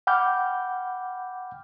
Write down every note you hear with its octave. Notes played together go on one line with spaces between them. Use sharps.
F#5 G5 B5 D6 F6 G6